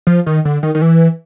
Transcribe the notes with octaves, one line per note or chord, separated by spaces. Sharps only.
F3
D#3
D3
D#3
D#3
E3